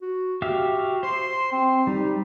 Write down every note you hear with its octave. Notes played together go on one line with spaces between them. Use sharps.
F#4
F#4 G4 E5 F5
C5 C6
C4
G3 D#4